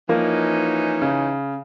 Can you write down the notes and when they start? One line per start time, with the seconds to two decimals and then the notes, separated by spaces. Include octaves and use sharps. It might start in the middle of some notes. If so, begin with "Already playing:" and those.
0.09 E3 F3 A#3 C#4 D#4
1.02 C#3